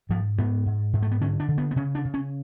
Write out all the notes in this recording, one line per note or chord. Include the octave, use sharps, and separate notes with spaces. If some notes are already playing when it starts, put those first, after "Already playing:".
G#2 F3
G#2 B3
G#2
G#2
A3
B3
D3 C#4
D4
D3
B3
B3
C#3 C#4
D4
C#3
C#4